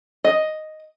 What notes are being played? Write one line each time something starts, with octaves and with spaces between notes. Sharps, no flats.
D#5